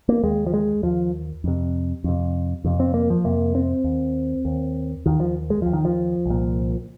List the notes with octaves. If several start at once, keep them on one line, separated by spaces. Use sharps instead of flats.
A#3
D#2 G#3
F3
G#3
D#2 F3
F2 C3
F2 C3
F2 C3
C4
A#3
F3
F2 C3 A#3
C4
D#2
D#2
D#2 D#3
F3
G#3
D#2 F3
D#3
F3
C2 A#2